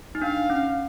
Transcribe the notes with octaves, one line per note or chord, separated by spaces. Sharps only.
D#4
D4 F5
C#4